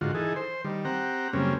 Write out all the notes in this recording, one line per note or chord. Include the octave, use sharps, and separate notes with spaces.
G#2 D3 D#3 F4 F#4
E3 D#4 G#4 A4
C5
D#3 G3
C4 G4 F#5 A#5
F#2 C#3 G3 A#3 C4 C#4